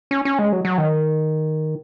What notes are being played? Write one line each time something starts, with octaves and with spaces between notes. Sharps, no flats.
C#4
C#4
G#3
F#3
F#3
D#3